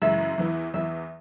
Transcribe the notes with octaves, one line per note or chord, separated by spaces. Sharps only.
F#2 C#3 E3 G#3 E4 E5
E2 E3 B3 E4
E2 E3 B3 E5